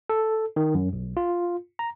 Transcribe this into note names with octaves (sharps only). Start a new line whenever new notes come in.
A4
D#3
F#2
B1
F4
A#5